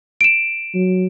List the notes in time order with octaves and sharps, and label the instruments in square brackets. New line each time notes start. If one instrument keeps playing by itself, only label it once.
[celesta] D7 E7
[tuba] F#3